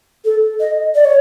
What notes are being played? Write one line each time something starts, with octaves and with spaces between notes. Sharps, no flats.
A4
D#5
D5
C#5